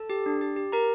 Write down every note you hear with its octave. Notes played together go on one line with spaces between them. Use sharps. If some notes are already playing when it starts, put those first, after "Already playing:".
Already playing: A4 A5
G4
D4
G4
G4
G4 A#4 A#5